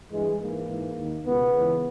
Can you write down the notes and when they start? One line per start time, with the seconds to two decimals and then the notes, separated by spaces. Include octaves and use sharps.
0.11 G2 E3 G#3
0.40 G#2 E3 A#3
0.68 G#2 E3
0.97 D#2 D#3
1.25 C#2 B2 B3
1.53 C#2 C#3 E3